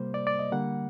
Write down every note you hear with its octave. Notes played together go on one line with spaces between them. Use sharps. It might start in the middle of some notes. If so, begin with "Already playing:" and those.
Already playing: C3 G3 A#3 C5
D5
D5
D#5
D3 G3 A#3 F#5